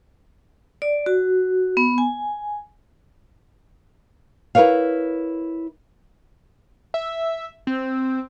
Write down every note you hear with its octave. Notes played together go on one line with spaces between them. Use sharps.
D5
F#4
B3
G#5
E4 A#4 B4 C#5 F5
E5
C4